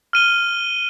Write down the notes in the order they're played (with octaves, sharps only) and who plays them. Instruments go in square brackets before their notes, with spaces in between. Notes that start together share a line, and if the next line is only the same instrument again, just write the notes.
[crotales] F6 D#7 G7